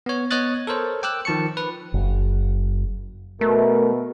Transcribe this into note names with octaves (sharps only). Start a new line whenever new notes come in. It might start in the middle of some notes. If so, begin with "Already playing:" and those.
B3 C#5
B3 C#5 D#5 D#6 F#6 A6
A4 A#4 C5 C#5
G5 D6 E6 F#6
D#3 F3 A5 C#6 C#7
B4
F#1
B2 A3 A#4